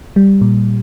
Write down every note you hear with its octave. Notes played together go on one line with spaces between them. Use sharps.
G3
A#2